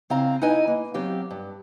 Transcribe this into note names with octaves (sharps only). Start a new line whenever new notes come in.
C#3 C4 E4 F5 A#5
D#4 E4 B4 D#5 G#5
A#3
F#3 C4 G4 F5
G2